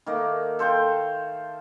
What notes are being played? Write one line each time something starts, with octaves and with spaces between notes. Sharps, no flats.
D#3 A3 A#3
A4 C5 F5 G5